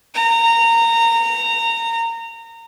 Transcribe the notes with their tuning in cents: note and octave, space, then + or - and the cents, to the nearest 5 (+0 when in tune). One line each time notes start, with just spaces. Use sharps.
A#5 -20